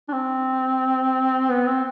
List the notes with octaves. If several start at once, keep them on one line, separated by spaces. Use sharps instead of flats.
D4
C4
B3
C4